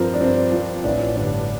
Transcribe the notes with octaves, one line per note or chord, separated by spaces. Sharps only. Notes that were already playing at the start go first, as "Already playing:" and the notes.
Already playing: G2 F3 C4 A#4
D4
G2 C4
F3 C4
A1 D4
G2 D3